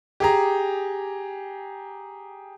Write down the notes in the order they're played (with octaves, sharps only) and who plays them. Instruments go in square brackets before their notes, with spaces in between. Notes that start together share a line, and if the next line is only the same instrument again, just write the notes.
[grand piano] G4 G#4 A#5